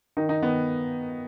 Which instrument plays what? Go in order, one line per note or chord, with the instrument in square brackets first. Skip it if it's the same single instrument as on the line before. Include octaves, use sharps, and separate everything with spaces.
[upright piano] D#3 D#4
D#4
D#3 B3